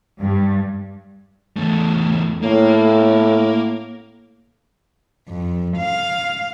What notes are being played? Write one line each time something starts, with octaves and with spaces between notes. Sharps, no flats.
G2
E2 A3
A2 A#3
F2
F5